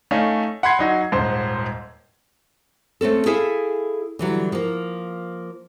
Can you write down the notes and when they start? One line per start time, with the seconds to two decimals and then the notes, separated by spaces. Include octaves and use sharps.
0.11 A3 C#4 D#4 F5
0.63 F#5 B5 C6 G#6 C7
0.79 F#3 D#4 F#4
1.12 D#1 G#2 C5
3.01 A3 C4 C#4 A4
3.26 E4 G#4 A4 E5 F5 G#5
4.19 D3 E3 F#3 G3
4.52 F3 A#3